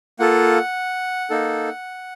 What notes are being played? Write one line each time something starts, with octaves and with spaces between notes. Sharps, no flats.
A#3 F4 A4 F#5
A#3 D#4 A4